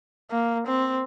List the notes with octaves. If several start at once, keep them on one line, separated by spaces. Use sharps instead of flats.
A#3
C4